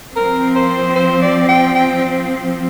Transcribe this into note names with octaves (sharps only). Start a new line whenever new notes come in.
F3 C4 A#4
C5
C5
D5
G5
G5